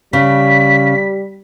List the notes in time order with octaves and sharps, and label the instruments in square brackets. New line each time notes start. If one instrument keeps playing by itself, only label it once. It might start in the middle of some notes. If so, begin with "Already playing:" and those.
[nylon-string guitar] C#3 [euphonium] G3 [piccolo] B6